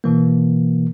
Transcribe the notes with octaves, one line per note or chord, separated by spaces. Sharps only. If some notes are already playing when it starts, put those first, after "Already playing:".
B2 E3 A#3